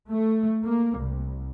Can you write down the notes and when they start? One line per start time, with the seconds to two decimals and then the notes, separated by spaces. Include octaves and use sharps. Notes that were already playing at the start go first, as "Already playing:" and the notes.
0.10 A3
0.63 A#3
0.97 C2